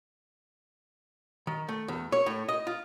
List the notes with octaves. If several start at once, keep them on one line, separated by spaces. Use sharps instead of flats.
D#3
A3
E2
C#5
A2
D#5
F4